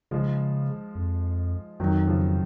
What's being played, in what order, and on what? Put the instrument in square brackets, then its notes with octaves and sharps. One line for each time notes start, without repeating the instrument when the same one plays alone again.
[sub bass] C#3 [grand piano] F3 G#3
[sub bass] F2
[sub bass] F2 [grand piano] D#3 F#3
[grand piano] C#3 F3